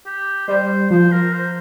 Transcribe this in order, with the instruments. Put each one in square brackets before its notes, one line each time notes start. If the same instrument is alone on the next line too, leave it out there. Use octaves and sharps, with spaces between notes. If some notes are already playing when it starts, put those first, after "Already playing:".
[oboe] G4
[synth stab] G3 [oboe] C5
[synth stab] F3 [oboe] C5
[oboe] A#4
C5